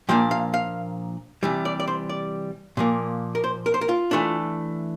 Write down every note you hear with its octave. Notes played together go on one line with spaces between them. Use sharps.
A#2 F3 A#3 D4 G5
F5
F5
C3 E3 G3
D5
D5
C5
D5
A#2 F3 A#3
A#4
C5
A#4
C5
A#4
F4
E3 A3 D4